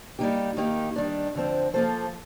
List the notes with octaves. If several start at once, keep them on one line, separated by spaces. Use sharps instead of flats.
G3 A#3 D#4 G4
D#3 A#3 D#4 G4
D#3 G3 D4
D3 F3 C4
F3 A#3 F4 A4 C5